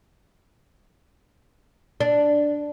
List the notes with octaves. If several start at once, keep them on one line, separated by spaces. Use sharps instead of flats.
D4